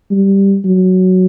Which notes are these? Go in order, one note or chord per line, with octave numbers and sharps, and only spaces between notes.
G3
F#3